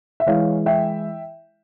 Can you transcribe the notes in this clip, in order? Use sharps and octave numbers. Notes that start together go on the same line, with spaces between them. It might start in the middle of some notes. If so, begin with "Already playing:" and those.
E5
E3 G#3 E4 C#5 F5
E5 G5